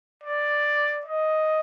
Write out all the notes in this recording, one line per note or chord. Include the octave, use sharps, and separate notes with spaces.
D5
D#5